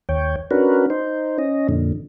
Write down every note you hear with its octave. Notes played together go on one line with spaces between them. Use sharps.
D#2 C#5 G5
C#4 D4 F#4 A#4 B4
D#4 C5
C#4 D#5
F2 A#2 D3